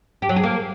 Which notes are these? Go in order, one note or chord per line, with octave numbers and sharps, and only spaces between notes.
G4
F#3
G#4
A#3